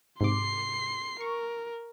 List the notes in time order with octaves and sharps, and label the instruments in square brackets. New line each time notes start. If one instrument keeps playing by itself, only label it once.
[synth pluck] G#2 C3 D6 [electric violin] C6 C7
[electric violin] A#4 [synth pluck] C#6